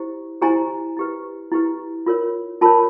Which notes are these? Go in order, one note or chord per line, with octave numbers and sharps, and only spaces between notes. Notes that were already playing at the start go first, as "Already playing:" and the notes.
Already playing: E4 G4 C5
E4 G4 C5 G#5 A#5
E4 G4 B4
E4 G4 B4
F4 A#4 C#5
F4 A#4 C#5 A5 B5